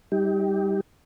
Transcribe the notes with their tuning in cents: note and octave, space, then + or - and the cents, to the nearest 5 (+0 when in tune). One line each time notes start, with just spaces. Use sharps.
G3 +0 D#4 +35 G4 +0